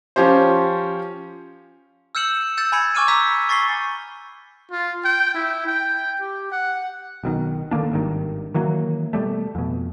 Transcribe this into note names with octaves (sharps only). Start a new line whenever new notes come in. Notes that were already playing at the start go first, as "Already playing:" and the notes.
F3 C#4 G4 C5
E6 F6 G6 C#7 E7 F#7
E6 G6 A6 C#7
G#5 B5 G#6 C#7
G#5 C#6 D6 F6 C#7 D#7
A#5 D6 E6 G6 B6
C#6 A6 B6 C7 G7
F4
G5
E4
G5
G4
F#5
B1 B2 D#3
D3 D#3 A#3 D4
G#1 G2 D#3
D#3 E3 F#3 A#3
B2 G3 A3
F2 B2